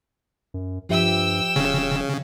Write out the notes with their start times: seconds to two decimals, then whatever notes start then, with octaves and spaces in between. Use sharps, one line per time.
0.54 F#2
0.89 G2 F3 G4 E5 G5 E6
1.56 D#1 C#3